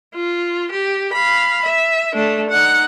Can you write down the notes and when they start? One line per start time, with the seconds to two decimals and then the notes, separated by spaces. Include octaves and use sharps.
0.15 F4
0.71 G4
1.13 F5 B5
1.65 E5
2.15 A3 D4
2.50 D#4 F#5